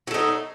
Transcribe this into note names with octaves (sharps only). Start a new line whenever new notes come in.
F#3 A3 D#4